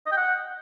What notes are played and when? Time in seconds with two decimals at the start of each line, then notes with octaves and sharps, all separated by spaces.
0.06 D#5
0.12 G5
0.17 F#5